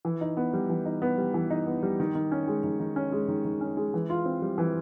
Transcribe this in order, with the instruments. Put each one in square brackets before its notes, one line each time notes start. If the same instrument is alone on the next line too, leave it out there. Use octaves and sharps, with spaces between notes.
[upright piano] E3
D#4
B3
G3
E3
D#4
B3
G3
E3
D#4
B3
G3
D#3
D#3
C#4
G#3
D#3
D#3
C#4
G#3
D#3
D#3
C#4
G#3
E3
F4
C4
G3
E3